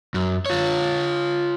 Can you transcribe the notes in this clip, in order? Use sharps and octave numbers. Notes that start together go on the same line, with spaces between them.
F#2
F4 C#5